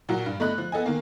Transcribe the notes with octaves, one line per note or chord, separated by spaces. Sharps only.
A#2 F#3 F#4
G2
A3 D#5 B5 F#6
F3
B3 A4 D#5 G#5
D#3 A#3